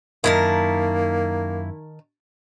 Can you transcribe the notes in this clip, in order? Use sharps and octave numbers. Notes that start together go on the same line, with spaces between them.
F#2 D#3 A#3 E4 A#4 A5